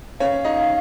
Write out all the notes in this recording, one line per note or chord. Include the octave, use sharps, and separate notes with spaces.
C#4 C#5 F5
D#4 D#5